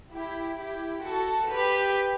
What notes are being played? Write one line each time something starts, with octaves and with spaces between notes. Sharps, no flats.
E4 G4
E4 G4
F#4 A4
G4 B4